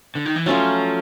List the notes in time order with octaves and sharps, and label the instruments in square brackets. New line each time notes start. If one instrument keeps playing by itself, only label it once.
[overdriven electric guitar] D3
D#3
E3
[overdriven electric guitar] F3 [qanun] F#3 A3 C#4 F4